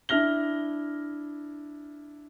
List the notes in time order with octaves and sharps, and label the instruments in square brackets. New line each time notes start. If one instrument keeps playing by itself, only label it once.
[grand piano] D4 E4 F6 A#6 G7